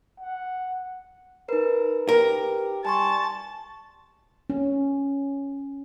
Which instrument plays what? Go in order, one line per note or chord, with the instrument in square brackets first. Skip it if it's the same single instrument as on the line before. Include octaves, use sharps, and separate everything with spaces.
[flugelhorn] F#5
[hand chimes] D#4 B4 [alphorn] A#4
[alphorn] G4 [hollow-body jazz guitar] A#4
[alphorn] G3 [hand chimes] G#5 C6 C#6 [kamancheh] A5
[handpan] C#4